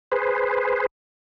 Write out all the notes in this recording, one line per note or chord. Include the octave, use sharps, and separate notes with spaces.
G#4 B4 C5